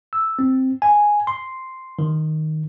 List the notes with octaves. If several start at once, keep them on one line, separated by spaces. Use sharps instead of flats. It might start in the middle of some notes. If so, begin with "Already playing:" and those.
E6
C4
G#5
C6
D#3